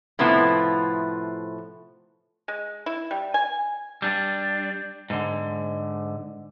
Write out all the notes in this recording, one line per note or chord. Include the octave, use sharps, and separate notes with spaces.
A2 C3 F3 B3 E4
G#3
E4
G3
G#5
G3 D4
G#2 D3